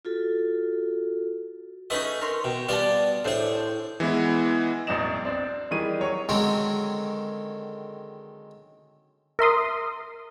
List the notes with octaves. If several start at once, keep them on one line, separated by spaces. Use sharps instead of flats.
F4 F#4 A4
A3 C#4 D#4 G#4 B4 D#5
A#4 C#5 C6
B2 G5 C#6
G3 B3 F4 D5 A5
A2 D4 G#4 A4 C5
E3 G#3 B3 E4
E1 A1 F#3 D5 D#5 E7
C4 D4 D5
D#3 E3 G3 G#4 D#7
F#3 C#5
D3 D#3 F#3 G#3 C4 C#4
A#4 E5 C6 D#6